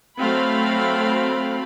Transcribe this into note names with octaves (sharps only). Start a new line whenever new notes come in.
F#3 A3 C4 F5 B5